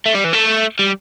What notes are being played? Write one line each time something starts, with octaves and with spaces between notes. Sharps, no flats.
A3
G3
E3
A3
G3